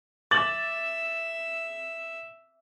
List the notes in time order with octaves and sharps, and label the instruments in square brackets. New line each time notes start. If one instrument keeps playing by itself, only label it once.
[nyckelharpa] E5 [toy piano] D6 [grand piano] A6 F#7